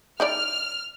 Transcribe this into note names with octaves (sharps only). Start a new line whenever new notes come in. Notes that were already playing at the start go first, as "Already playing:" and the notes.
D#4 E4 D5 F6